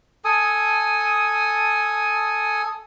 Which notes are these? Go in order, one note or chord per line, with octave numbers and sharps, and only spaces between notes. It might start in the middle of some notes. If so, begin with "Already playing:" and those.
A4 G#5 D#6